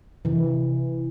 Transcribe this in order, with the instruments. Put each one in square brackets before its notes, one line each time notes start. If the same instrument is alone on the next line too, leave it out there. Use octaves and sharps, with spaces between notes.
[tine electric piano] C3 [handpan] E3